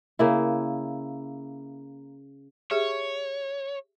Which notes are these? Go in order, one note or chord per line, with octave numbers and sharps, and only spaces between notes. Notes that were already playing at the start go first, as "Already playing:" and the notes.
C#3 A#3 E4
G4 G#4 C#5 E5